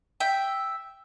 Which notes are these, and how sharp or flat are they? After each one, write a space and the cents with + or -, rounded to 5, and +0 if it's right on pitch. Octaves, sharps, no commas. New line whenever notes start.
E5 +0 G5 +0